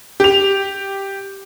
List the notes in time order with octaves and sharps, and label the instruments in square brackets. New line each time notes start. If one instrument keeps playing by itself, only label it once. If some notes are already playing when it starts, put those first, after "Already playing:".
[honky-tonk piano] G4 F7